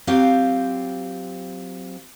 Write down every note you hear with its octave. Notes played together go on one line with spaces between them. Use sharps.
F#3 C4 F4 G4 C5 F5